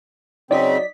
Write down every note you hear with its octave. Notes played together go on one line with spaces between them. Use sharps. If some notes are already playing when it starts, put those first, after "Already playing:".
C#3 F#3 C4 D#4 D5 D#5 B6